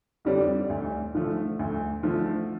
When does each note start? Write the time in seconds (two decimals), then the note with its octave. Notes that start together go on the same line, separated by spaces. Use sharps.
0.25 F2 D3 G3 D4
0.70 D2
1.15 D3 F3 A3
1.59 D2
2.03 D3 F3 A3